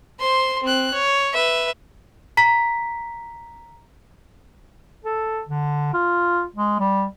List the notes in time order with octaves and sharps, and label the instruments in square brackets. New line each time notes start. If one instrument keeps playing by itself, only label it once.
[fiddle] C5 C6
C4 F#6
C#5
B4 E5
[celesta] A#5 B6
[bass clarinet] A4
D3
F4
G#3
G3